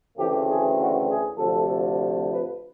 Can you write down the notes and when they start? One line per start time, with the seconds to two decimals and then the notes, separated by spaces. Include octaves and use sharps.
0.17 D2 C#3 E3 A3 C4 G4
0.48 G#4
0.78 F#4
1.08 G#4
1.38 D2 C3 F3 A4
2.30 B4